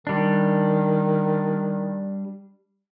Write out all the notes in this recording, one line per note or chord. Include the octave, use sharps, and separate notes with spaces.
D#3 G3 D4